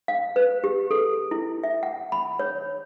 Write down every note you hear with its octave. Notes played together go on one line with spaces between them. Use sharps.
F5
B4
G4
A4
E4
E5
F#5
B5
C#5